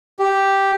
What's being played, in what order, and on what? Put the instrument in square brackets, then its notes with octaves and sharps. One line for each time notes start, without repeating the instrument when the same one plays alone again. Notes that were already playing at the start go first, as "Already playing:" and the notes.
[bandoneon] G4